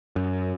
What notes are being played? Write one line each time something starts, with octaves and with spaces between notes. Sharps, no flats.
F#2